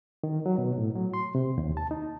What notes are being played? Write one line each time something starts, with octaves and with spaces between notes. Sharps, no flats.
D#3
F#3
B2
A2
F#3
C6
C3
D#2
A5
D#4